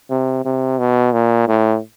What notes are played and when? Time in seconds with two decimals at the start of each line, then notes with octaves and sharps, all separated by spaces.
0.10 C3
0.45 C3
0.79 B2
1.13 A#2
1.48 A2